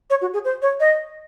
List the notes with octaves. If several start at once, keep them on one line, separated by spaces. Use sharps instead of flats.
C#5
F#4
G#4
C5
C#5
D#5